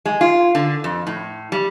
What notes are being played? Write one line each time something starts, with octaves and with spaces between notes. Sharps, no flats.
G#3
F4
D3
F2
A2
G3